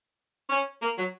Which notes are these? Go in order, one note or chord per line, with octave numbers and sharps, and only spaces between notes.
C#4
A#3
F#3